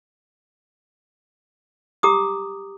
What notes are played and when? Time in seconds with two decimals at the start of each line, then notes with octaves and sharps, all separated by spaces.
2.03 G4 A#5 D6 D#6